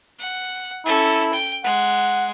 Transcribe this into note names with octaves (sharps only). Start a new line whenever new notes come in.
F#5
C#4 E4 A4
G5
G#3 F#5